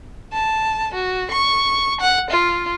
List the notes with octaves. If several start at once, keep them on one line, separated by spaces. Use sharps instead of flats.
A5
F#4
C#6
F#5
F4